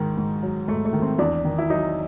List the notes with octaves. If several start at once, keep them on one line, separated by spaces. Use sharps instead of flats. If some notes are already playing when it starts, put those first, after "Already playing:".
Already playing: G#2 D#3
G#2
F#3
G#2 A3
A3
D#3
C4
E2 D4
D#3
E4
F#3 D#4